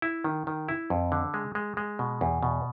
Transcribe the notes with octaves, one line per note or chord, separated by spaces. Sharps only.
E4
D#3
D#3
E4
F2
D3
G#3
G#3
G#3
B2
E2
B2